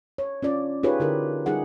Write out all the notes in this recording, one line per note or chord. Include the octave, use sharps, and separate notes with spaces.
C#5
C#4 F4 D5
D#4 F4 G4 G#4 B4 C#5
D3 E4 G4 A#4
G3 D#4 F4 G#4 F#5